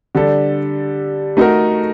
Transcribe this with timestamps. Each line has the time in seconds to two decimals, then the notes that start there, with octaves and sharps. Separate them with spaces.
0.15 D3 G3 D4 A4
1.37 A3 D#4 F#4 A#4